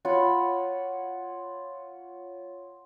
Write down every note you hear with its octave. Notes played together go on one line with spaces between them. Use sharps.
F4 C#5 F#5 B5